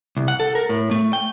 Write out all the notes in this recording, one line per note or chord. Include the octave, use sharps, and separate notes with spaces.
C2
F#5
A4
A#4
A2
A3
G5